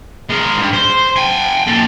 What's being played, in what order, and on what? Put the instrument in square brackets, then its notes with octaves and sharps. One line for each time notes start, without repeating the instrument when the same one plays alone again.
[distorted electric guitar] G#3 A#4
G2
C5
G5 G#5
A#2 A4